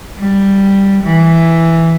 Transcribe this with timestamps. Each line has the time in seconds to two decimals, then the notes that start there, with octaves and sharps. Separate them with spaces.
0.18 G3
1.04 E3